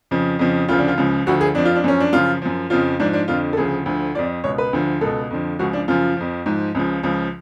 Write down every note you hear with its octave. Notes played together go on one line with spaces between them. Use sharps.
F2 C#3 F3
F2 C#3 F3
D2 C#3 F3 F4
D4
F4
C#2 C#3 F3
D2 D3 F3 F#4
G#4
F2 F3 D4
F4
D4
F#2 F3 C#4
D4
F#2 C#3 F3 F4
F#2 F3
F2 C#3 F3 F4
G#2 F3 D4
D4
F2 D3 F3 F4
A4
D2 C#3 F3 G#4
D2 D3 F3
F2 F3 D5
C#2 B2 C#5
B4
D2 D3 F3
C#2 B2 A4
F2 D3 F3
C#2 C#3 F3 F#4
D4
F#2 C#3 F3 F4
F2 F3
G#2 F3
C#2 C#3 F3
C#2 C#3 F3